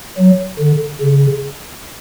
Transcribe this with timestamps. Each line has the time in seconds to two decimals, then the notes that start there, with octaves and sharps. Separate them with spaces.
0.18 F#3
0.59 D3
1.01 C#3